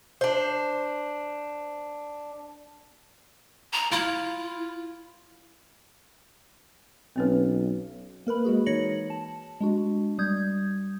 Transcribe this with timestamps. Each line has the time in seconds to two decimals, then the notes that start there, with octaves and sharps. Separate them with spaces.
0.21 D4 C5
3.73 A#5
3.92 E4 F4
7.16 B1 C4 C#4 B4
8.27 A#3 A#4 B4 B5
8.45 G#3 F#4 G#4
8.66 E3 D#4 C#5 A#6 C#7 F#7
9.10 A5
9.61 G#3 D4 F#4
10.18 G3 D#6 G6 G#6